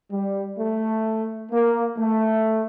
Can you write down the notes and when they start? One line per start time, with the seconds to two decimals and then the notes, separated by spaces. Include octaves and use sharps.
0.12 G3
0.59 A3
1.52 A#3
1.99 A3